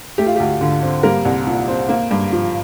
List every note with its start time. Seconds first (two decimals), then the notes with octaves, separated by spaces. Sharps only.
0.18 A3 G4
0.26 F4
0.36 G4
0.40 D2
0.61 D3 F4
0.82 C4
1.03 G3 A#3 A#4
1.25 C2
1.46 A#2
1.68 C4
1.89 A#3
2.11 G2
2.32 F3